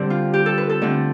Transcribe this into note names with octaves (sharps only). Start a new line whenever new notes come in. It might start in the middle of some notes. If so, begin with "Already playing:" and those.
Already playing: D3 G3 C4 G4
F4
G4
A4
B4
A4
D3 A3 C4